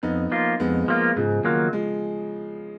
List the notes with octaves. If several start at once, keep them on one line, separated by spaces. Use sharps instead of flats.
F2 B3 D#4
F3 A#3 F4
F2 G#3 B3
F3 A#3 F4
G#2 C#3 F3
D#3 F#3 A#3 F4
F3 G#3